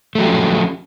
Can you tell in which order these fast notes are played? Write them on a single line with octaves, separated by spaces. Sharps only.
A3 F#3 G4 F3 C#4